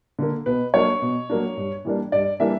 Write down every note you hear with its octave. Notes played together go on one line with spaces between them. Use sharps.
D3 A#3
B2 B4
F#3 A#3 D4 C#5
B2
F#3 A#3 D4
G2
E3 G3 A#3 D4
G2 D5
E3 G3 A#3 D4 E5